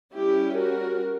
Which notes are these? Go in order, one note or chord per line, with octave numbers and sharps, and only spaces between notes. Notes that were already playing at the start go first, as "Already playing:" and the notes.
G3 C#4 E4 G4
F#4 A#4